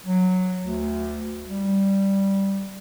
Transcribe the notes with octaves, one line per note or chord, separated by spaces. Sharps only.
F#3
D2
G3